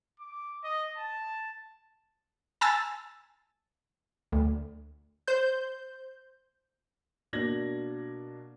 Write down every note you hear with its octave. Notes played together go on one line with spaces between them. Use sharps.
D6
D#5
A5
G#5 A5 E6 A6
D2
C5 G6
B2 A#3 D4 G#6 A#6 F#7